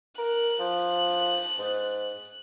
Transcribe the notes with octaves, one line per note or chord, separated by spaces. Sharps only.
A#4 F#6
F3
G#2